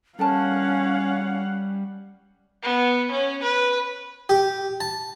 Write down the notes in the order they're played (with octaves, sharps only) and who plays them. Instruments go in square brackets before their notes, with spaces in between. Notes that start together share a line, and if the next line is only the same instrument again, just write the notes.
[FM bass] G3 [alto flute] C#4 [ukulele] A4 A#4 A5 [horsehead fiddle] F5 F#5
[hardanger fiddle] B3
C#4
B4
[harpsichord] G4
A5